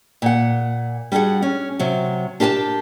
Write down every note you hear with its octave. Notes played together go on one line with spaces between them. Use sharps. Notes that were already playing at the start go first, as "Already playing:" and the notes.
A#2 F#5
G3 D4 F#4 G#4 F#5
C#4
C3 F#3
D4 G4 A#4 G#5 A5